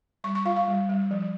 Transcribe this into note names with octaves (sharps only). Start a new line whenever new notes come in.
G3 C#6
C#6
F4 F5
F5
G3
G3
F3